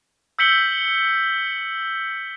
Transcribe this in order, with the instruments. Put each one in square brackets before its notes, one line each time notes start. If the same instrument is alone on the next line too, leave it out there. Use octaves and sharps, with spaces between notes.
[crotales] E6 G6 B6 C#7 F#7 G7